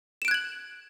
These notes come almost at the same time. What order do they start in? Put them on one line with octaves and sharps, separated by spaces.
E7 D7 F#6 G#6 F#7